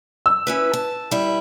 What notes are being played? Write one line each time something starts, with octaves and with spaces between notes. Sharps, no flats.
E6
C#4 E4 B4
A5
G3 E4